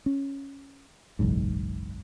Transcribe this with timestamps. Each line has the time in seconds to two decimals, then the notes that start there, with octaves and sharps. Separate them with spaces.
0.06 C#4
1.19 F#1 B1 E2 G#2